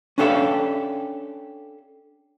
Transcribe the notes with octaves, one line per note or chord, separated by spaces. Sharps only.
C#4 D4 G4 A4 E5 F5